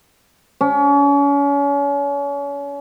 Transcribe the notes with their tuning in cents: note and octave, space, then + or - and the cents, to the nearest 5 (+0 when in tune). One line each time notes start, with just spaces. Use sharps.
C#4 +35